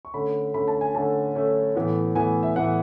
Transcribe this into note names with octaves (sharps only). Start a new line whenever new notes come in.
C#6
D3 A3 C#4 B5
D3 A3 C#4 B5
A5
G#5
D3 A3 C#4 A5
D3 A3 C#4
A2 E3 B3
A2 E3 B3 G#5
E5
A2 E3 B3 F#5